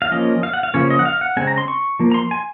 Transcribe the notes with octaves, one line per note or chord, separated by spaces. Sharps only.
F5
F3 A#3 C#4 D#5
F5
F#5
F5
C#3 F3 A#3 C#4 C#5
D#5
F#5
F5
F#5
C#3 G#3 C4 G#5
A#5
C6
C#6
F3 A#3
A#5
C6
G#5